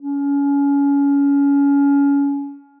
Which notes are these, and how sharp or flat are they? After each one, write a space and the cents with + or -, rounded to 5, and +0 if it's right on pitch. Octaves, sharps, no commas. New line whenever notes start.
C#4 +25